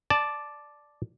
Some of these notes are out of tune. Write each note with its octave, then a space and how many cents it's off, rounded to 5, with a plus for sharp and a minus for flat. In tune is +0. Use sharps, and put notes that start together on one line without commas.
D5 +0 A5 -10